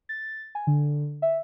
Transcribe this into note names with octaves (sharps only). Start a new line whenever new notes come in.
A6
G#5
D3
E5